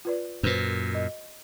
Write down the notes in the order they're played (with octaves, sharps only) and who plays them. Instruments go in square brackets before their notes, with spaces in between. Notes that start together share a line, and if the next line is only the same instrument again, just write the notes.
[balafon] F4 B4 D5
[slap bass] F#2 A#2 [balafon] F#4 B4 C5
[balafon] D#5